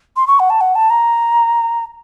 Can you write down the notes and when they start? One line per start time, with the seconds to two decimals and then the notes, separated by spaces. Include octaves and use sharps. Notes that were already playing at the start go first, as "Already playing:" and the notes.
0.16 C6
0.27 C#6
0.40 F#5
0.50 A5
0.61 F#5
0.75 A5
0.90 A#5